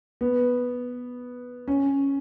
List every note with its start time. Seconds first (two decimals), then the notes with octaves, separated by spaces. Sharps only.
0.21 B3
1.68 C#4